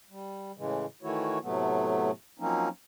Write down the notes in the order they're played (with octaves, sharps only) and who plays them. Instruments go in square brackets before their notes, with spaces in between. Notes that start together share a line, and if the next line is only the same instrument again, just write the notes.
[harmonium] G3
A2 C#3 E3 G#3
D#3 E3 A3 E4 F#4 C#5
A2 C3 F#3 A3 B3
F3 F#3 A#3 C4 C#4 D#4